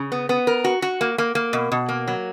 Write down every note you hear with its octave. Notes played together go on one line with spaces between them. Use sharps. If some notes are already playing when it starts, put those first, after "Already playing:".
Already playing: C#3
B3
B3
A#4
F#4
F#4
A#3
A#3
A#3
B2
B2
A#3
F#3